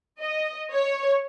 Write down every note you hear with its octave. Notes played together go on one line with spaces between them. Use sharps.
D#5
C#5